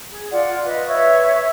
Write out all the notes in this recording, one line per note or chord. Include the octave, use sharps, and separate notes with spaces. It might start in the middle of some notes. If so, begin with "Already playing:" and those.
G#4
F4 D5 F#5
B4 D#5
B4 C#5 E5 C#6